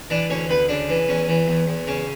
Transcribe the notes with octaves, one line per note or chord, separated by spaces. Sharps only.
E3 D4 D5
D2 C#4 C#5
D2 B3 B4
C#3 D4
E3
E2 C#4
E3
E2
E2
C#3 C#4